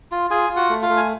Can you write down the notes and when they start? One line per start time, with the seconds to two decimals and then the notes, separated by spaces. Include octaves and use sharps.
0.12 F4
0.30 F4 G#4 G#5
0.50 F4
0.56 F#4 F#5
0.70 A3
0.82 F4 F5
0.89 A3
0.97 G#5